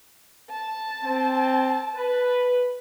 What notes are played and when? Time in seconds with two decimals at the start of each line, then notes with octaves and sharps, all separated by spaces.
0.50 A5
1.03 C4
1.96 B4